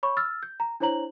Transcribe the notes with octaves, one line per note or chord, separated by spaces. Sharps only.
C#5 B5 C#6
E6 F6 A6
G6
A#5
D4 E4 C5 C#5 A#5 F#7